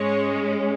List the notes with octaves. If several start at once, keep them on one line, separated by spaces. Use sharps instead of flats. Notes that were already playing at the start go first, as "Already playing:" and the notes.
Already playing: G#2 G#3 C#4 C#5